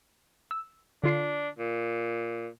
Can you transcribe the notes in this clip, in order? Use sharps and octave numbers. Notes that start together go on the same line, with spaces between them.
E6
D3 D4 F4 C7
A#2